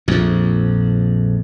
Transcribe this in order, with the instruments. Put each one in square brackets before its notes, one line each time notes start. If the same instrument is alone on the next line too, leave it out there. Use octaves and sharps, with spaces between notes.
[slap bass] A#1 F2